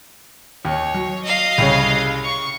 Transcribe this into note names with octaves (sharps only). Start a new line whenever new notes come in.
D#2 C#5
F#3
D#5 F5
C2 C#3 C#5
C#6